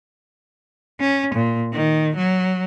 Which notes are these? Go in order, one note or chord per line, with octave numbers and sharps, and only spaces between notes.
C#4
A#2
D#3
F#3